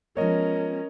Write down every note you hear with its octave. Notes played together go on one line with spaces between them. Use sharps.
F3 G#3 B3 C#4 A#4 C#5 D#5